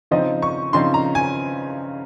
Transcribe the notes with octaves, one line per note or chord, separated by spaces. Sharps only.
C#3 F3 C4 D#4 D#5
C#6
C#3 F3 C4 D#4 C6
A#5
G#5